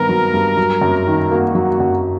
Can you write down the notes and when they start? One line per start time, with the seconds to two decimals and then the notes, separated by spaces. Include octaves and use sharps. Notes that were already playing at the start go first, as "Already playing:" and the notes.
Already playing: G2 D#3 B3 A#4
0.09 F#3
0.34 G2
0.57 F#3
0.81 F#2
1.07 D#3
1.31 A#3 F#4
1.55 F#3
1.80 F#2